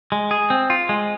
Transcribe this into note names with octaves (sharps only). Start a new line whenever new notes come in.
G#3
G#4
C4
F4
G#3